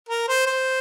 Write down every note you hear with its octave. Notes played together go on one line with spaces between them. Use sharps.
A#4
C5
C5